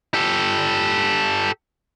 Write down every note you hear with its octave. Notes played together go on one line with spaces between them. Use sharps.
G4 A4